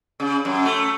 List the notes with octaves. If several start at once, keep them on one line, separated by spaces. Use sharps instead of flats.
C#3
F#2
A3